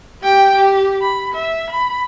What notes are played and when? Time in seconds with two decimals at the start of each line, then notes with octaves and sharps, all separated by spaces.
0.22 G4 G5
0.56 G4
1.01 B5
1.34 E5
1.70 B5